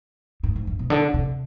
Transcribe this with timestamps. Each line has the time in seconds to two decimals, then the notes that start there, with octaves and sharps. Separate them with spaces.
0.43 G#2
0.56 G#2
0.67 G2
0.79 B2
0.90 D3
1.14 C3